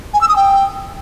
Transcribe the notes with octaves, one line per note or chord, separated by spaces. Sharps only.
G#5
E6
D#6
G5